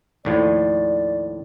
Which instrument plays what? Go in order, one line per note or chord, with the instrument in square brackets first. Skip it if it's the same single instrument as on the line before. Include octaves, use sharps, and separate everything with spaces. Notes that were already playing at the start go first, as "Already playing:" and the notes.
[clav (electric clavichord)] D#2 A2 F3 [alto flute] D5